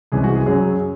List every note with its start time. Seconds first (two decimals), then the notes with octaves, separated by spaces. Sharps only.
0.12 C2 C3 E3 G#3 C#4 G#4
0.24 F#4
0.35 G#4
0.46 F#2 C#3 F#3 G#4